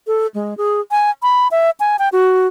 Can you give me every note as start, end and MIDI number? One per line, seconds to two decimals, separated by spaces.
0.07 0.27 69
0.34 0.54 56
0.58 0.81 68
0.91 1.10 80
1.23 1.48 83
1.51 1.70 76
1.80 1.97 80
1.99 2.09 79
2.12 2.47 66